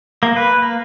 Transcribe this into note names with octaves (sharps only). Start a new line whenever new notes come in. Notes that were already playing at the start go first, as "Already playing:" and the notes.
A#3
B4
A#3